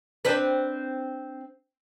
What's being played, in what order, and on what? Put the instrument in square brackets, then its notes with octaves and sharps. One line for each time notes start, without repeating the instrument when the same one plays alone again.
[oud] C4 D4 B4